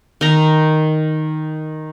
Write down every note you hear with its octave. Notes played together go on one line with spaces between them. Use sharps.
D#3 A#5